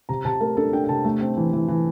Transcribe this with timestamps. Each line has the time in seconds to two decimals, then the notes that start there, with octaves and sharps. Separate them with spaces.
0.09 C3 A#5
0.25 C3 A5
0.41 A3 A#4
0.57 D4 A4
0.73 D4 G5
0.84 G5
0.89 C3 A5
1.05 A3
1.21 C4
1.37 E3
1.53 E3
1.68 E3